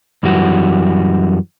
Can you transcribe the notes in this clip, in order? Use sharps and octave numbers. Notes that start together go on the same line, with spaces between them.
F#2 E3 G3 F#4